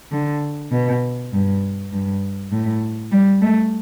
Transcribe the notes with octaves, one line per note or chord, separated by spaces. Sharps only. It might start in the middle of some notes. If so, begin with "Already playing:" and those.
D3
B2
G2
G2
A2
G3
A3